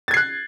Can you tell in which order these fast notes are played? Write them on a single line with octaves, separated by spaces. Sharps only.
A6 G#6 C7 F#6